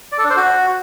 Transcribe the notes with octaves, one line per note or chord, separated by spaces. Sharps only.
D5
A4
D4
C5
F#4